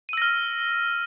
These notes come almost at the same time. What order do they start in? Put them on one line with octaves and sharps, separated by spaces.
D#7 E6 A#6 F6